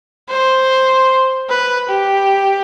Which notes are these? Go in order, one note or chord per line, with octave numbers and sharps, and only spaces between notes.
C5
B4
G4